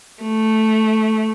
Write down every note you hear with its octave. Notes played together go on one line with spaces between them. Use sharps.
A3